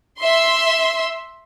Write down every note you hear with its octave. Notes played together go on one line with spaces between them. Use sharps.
E5 C6